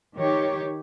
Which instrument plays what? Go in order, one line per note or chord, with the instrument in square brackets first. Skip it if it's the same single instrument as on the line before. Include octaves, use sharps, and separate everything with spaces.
[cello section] D#3 G4 C#5